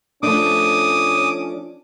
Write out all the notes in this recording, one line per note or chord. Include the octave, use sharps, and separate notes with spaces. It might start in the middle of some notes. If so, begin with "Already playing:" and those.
F3 A3 C#4 D4 D6 D#6